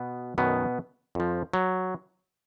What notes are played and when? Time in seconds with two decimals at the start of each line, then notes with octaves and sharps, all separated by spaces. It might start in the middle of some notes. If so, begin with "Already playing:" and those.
Already playing: B2 B3
0.38 F#2 B2 D#3 F#3 B3
1.15 F2 F3
1.53 F#3